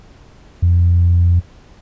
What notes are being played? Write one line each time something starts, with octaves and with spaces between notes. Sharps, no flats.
F2